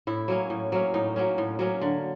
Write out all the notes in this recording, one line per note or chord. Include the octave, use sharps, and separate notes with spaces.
A2 E4
F#3 A#3 C#4
A2
F#3 A#3 C#4
A2 D#4
F#3 A#3 C#4
A2
F#3 A#3 C#4
D3